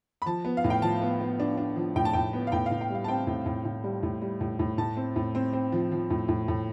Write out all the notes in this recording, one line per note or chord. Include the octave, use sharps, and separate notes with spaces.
B5
F3 A5
B3
F5
A2
G5
F3 A5
B3
B3
D4
D4
F3
A2 G5
A5
A2 G5
B3
F5
A2 G5
F5
A2
G5
G3 F5
A5
C4 G5
A2
A2
A2
G3
A2
G3
A2
A2
A2 A5
C4
A2
C4
C4
F3
F3
A2
A2
A2